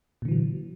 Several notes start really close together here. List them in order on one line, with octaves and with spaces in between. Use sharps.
A#2 D3 E3 F#3